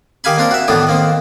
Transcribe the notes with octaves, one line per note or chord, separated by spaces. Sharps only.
D#3 G4 F5 G#5 B5
A#3 C4 D4 A#4
F#4 E5
A2 D#3 E3 B3 D4
D#3 A#3 C4